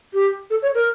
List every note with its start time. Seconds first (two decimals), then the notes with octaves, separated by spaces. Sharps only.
0.14 G4
0.50 A4
0.62 C#5
0.75 A#4